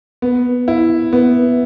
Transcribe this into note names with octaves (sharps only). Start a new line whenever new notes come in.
B3
E4
B3